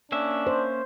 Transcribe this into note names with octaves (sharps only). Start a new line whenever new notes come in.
A#3 C#4 D4 E5
C5